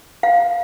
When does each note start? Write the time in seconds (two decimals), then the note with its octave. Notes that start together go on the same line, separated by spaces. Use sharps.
0.23 F5